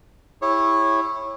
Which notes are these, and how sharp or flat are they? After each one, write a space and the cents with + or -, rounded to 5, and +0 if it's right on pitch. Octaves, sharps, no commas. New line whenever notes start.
E4 +0 G4 +40 C#5 -15